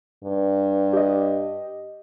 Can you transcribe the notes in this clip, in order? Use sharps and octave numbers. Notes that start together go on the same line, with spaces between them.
G2
G4 D#5